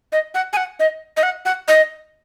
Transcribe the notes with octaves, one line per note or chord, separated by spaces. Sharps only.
D#5
F#5
G#5
F#5
D#5
D#5
F#5
F#5
D#5